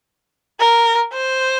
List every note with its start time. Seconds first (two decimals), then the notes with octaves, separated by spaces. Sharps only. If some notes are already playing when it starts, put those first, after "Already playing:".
0.60 A#4
1.13 C5